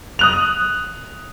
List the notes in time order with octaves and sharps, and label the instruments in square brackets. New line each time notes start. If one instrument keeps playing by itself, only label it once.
[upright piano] D#6 F#6 F7